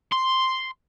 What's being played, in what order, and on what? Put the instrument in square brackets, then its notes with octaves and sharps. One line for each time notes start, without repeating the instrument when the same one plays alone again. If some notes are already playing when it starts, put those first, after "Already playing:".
[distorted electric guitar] C6